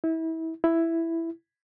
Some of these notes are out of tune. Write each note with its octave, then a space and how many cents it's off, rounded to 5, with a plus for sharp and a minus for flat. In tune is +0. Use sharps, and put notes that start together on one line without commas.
E4 -30
E4 +5